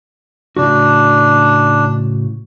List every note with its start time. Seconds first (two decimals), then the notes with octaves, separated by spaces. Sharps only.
0.57 A2 C#3 D4 F#4